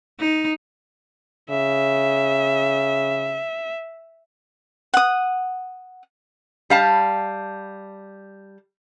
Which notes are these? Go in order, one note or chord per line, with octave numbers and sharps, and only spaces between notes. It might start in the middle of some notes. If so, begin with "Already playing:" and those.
D#4
C#3 E5
F#5 D#6
G3 F5 A5